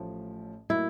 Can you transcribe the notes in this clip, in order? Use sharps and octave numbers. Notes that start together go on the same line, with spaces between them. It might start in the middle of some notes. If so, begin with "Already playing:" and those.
Already playing: A1 A2 F3
A2 F#3 A#3 E4